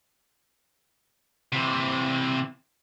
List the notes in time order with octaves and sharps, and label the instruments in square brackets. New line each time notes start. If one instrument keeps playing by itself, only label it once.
[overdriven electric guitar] C3 E3